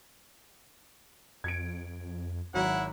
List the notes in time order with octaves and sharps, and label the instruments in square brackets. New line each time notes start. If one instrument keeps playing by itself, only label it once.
[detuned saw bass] F2 [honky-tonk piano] G#6 C#7 D7
[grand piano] G#1 C#5 A#5 [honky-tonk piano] F#3 [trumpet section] E4 F#5